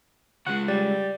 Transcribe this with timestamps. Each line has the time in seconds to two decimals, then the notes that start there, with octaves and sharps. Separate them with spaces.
0.47 C#3 G#3 F#5
0.68 G3 D5